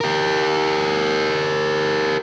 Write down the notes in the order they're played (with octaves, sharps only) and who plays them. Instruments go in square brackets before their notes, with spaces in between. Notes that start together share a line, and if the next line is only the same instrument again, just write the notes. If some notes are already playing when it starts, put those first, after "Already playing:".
[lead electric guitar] G4 A#4